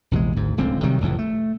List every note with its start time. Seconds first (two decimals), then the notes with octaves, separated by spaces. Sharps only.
0.11 A#1 E2 C3 G#3
0.36 G#1 D2 G#2
0.57 D1 C#2 D3 C4
0.83 C3 D#3 F#3 G3
1.01 F1 C#2 A2 E3
1.18 A3